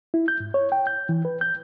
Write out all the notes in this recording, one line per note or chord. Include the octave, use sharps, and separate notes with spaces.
E4
G6
G#2
C#5
G5
G6
E3
B4
G6